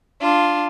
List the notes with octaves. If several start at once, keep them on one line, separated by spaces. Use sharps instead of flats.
D4 F4